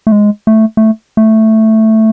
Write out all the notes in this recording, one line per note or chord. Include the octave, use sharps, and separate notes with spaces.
A3
G#3
A3
A3
A3